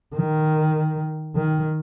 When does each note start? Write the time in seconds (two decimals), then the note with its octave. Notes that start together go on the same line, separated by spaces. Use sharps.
0.14 D#3
1.35 D#3